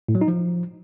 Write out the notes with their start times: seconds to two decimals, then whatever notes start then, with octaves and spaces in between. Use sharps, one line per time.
0.08 A2
0.15 F#3
0.21 D#4
0.28 F3